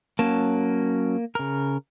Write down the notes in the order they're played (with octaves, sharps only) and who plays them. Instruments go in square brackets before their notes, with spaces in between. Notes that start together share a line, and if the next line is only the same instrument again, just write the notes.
[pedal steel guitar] F#3 C#4 A5 [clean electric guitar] A#3
[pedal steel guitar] C#3 A#4